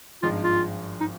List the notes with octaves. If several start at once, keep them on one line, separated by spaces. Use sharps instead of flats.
G#1 G2 F3 G#3 D#4 F4
F4
D#4